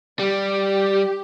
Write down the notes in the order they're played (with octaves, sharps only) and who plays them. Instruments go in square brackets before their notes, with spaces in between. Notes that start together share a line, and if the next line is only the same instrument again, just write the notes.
[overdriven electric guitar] G3 [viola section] G4